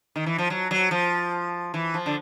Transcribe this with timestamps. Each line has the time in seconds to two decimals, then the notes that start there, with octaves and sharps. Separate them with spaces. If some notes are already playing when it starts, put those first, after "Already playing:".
0.16 D#3
0.26 E3
0.38 F3
0.50 F#3
0.71 F#3
0.91 F3
1.74 E3
1.94 F3
2.06 D3